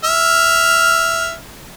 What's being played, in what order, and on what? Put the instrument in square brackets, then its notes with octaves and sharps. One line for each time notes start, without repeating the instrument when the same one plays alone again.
[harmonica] E5 F6